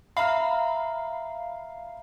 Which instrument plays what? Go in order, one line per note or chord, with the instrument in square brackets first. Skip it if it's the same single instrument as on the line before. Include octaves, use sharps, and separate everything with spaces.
[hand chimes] E5 A#5 [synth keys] F5 [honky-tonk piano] B5 F6